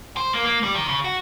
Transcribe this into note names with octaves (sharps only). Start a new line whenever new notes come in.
C5
A#3
A#3
G3
D#3
C#3
F#4